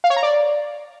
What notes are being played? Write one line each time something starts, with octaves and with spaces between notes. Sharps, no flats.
F5
C#5
A#5
D5